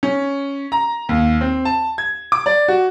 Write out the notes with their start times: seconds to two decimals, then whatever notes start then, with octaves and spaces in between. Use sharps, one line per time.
0.03 C#4
0.72 A#5
1.09 D#2
1.41 C4
1.65 A5
1.98 G#6
2.32 D6
2.46 D5
2.68 F#4